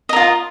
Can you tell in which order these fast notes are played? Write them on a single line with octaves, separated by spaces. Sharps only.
D#5 A#4 F4